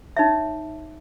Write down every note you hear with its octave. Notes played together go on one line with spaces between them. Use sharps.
D#4 C#5 E5